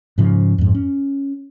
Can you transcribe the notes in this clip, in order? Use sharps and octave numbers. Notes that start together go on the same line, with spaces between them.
G#2 C#3 F3
F2 G#2
C#4